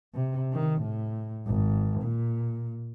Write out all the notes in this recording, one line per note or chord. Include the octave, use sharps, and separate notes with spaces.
C3
D#3
A2
G#1
A#2